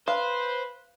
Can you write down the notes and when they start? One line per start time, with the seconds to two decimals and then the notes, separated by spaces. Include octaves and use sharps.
0.08 B4 C5 F5